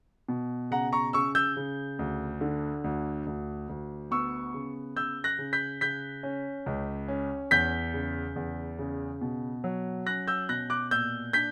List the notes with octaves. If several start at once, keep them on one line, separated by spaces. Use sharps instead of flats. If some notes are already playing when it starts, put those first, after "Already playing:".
B2
C#3 F#5 A#5
A#5 C#6
C#3 C#6 E6
E6 G6
C#3
D2
D3
D2
D2
D2
B3 C#6 E6
C#3
C#3 E6 G6
F#6 A#6
C#3
G6 B6
C#3 G6 B6
C#4
C#2
C#4
E2 G6 B6
C#3
E2
C#3
B2
F#3
C#4 F#6 A#6
E6 G6
B2 F#6 A#6
D6 F#6
A#2 E6 G6
D4 G6 B6